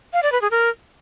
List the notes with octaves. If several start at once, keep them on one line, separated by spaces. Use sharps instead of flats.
F5
D5
B4
G#4
A#4